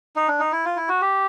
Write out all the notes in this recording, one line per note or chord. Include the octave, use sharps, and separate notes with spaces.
D#4
D4
D#4
E4
F4
E4
F#4
G4